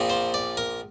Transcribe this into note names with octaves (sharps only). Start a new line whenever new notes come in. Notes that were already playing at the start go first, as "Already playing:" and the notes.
Already playing: A#1 A#2 F3 C4
C5
D5
A#4